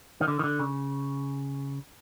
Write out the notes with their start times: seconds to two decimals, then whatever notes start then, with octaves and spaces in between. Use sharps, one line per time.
0.21 D#3
0.28 D3
0.39 D#3
0.44 D3
0.60 C#3